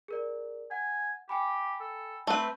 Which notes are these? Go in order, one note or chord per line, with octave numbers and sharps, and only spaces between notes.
G#4 A#4 D5
F#5 G#5
G4 G5 G#5 B5
A4
A3 C4 B4